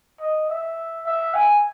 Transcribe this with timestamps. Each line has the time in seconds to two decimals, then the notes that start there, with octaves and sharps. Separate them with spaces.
0.21 D#5
0.50 E5
1.06 E5
1.34 G#5